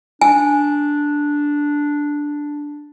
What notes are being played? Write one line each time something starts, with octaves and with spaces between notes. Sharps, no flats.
D4 G#5